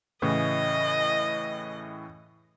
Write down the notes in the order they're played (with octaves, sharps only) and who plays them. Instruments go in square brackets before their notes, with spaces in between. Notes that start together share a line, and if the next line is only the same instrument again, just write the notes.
[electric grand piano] A2 C#3 E3 [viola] D#5